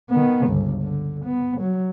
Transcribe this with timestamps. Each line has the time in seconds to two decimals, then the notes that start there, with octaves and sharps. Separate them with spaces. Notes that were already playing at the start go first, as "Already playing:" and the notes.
0.10 D#3 B3
0.47 G1 C#2
0.82 D3
1.25 B3
1.60 F#3